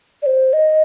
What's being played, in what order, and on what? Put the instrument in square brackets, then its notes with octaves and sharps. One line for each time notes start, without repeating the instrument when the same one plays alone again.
[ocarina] D5
C5
D#5